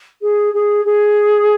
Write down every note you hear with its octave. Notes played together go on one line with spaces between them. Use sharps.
G#4
G#4
G#4